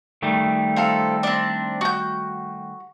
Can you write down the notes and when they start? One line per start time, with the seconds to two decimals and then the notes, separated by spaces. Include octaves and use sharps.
0.22 D#3 G3 A3
0.76 C4 F4 A4
1.23 C4 D4
1.81 F#4 G6